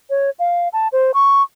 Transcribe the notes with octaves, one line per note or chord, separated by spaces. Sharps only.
C#5
F5
A5
C5
C#6